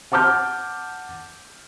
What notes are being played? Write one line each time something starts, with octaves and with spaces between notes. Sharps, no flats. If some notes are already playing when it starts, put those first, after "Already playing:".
F#5 A5 D6 F6 G6